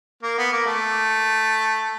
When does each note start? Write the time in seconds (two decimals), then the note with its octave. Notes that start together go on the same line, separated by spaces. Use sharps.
0.23 A#3
0.38 B3
0.52 A#3
0.66 A3